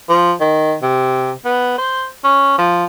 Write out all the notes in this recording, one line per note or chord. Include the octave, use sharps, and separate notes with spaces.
F3
D#3
C3
B3
C5
C#4
F3